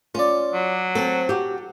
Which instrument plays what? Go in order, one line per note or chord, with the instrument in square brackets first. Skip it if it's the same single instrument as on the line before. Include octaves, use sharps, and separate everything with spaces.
[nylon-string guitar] C#4 [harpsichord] F4 D5
[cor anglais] F#3
[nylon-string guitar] C4 [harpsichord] A4 A5
[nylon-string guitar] F#4 G4